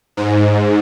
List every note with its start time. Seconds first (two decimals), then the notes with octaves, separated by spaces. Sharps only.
0.17 G#2